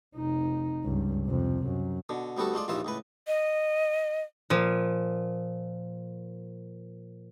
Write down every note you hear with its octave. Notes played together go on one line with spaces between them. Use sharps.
F1 D#4
C#2 G2
F2 C3
F#2
B2 D3
D2 G3 B3 F#4 A4
G#3 A3 F4 D5
A#1 D#2 A#2 E3 F4 E5
C#2 A2 B4
D#5
A#2 F3